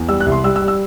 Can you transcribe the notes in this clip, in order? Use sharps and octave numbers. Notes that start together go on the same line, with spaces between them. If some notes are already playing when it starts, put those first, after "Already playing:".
Already playing: E2
G3 E6
F#6
C2
C6
G3 E6
E6
G3
E6